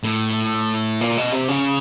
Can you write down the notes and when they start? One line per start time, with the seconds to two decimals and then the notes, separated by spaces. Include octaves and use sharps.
0.04 A2
1.01 A#2
1.17 B2
1.32 C3
1.48 C#3